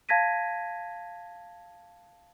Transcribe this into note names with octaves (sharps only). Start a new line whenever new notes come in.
F5 A5 G#6 A#6 B6 D#7